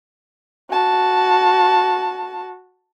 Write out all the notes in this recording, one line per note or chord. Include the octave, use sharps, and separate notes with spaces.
F#4 A5